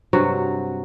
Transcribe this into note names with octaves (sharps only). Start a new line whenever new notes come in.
G2 C3 F#3 F#4